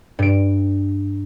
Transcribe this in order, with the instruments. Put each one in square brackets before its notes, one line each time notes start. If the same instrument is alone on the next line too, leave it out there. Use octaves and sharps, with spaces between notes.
[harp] G2 D7